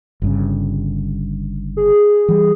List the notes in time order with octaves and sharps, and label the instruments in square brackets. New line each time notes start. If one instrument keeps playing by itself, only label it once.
[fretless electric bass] G1 G2 C#3
[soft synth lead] G#4
[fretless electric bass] E3 G3